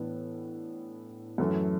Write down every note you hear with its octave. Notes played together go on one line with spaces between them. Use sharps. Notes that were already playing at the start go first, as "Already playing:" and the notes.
Already playing: A2 E3 B3 D4
F#2 E3 A3